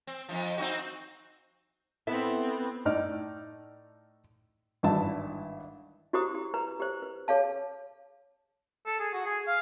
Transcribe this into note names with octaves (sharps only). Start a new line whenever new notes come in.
C4
F2 G#2 F3
C4 D#4 F#4
B3 C4 E4 A4 E5
A2 D#4 D5 F6
G#1 G2 E3 E5 A5
E4 F#4 G4 C5 A#5 D#6
G4
B4 A#5
G4 C5
B4
G#4 C#5 F5 A5
A4
G#4
F#4
G#4
F5